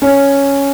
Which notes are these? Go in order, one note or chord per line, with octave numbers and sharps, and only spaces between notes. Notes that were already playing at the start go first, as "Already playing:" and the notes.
C#4